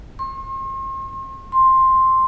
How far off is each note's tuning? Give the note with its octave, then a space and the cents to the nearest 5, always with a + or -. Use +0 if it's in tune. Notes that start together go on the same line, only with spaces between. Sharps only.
C6 +45
C6 +5